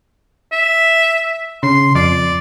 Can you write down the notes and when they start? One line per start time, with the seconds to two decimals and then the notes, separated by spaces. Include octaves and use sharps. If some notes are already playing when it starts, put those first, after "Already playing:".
0.52 E5
1.63 C#3 C6
1.95 F2 D5